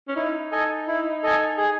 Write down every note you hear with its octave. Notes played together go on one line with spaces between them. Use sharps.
C#4
D#4 E4
A4 D#5 G#5
E4
A4 D#5 G#5
G#4